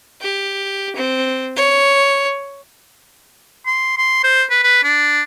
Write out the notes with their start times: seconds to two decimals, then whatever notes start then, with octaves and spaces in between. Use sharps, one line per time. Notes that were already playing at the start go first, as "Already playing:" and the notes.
0.21 G4
0.96 C4
1.57 C#5
3.66 C6
3.98 C6
4.23 C5
4.50 B4
4.64 B4
4.84 D4